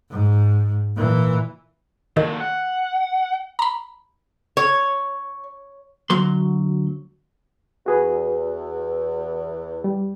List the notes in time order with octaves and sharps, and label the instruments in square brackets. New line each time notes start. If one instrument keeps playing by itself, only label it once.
[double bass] G#2
A#2 E3
[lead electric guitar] A#2 A3 [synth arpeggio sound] D#3
[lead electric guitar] F#5
[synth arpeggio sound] A#5 B5
[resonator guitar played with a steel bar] C#5
[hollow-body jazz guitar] D2 F#3 C6
[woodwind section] E2 [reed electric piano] F#4 G#4 B4
[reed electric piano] G3